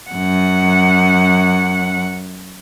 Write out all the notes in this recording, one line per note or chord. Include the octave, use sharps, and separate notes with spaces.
F#2 F#5